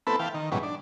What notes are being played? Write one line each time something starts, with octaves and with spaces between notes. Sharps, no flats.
A3 B3 C4 E4 A4 B4
E3 F5 G5 A5
D#3
G#2 B2 E3 F#3 G3 C#4
D4